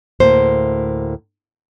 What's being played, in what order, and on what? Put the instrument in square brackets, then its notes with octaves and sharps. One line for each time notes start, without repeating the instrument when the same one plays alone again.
[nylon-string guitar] D2 A2 A#3 C5